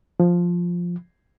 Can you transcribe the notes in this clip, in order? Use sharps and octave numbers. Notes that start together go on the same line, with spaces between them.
F3